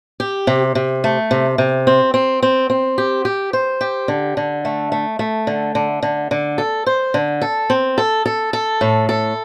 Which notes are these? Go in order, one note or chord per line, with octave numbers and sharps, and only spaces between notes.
G4
C3
C3
A3
C3
C3
C4
C4
C4
C4
G4
G4
C5
G4
D3
D3
A3
A3
A3
D3
D3
D3
D3
A4
C5
D3
A4
C4
A4
A4
A4
A2
A4